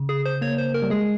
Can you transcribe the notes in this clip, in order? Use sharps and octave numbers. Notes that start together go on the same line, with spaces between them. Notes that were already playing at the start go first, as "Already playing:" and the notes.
Already playing: C#3
G#4
C5
A#3 C#5
C5
A#4
G3
G#3 G#4